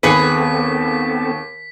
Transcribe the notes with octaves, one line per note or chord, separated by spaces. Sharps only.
D#2 B3 C4 G#4 A4 B4 B6 C#7